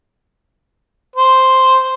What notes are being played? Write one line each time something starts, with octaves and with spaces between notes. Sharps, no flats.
C5